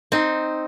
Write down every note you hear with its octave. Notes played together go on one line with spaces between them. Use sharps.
C4 D#4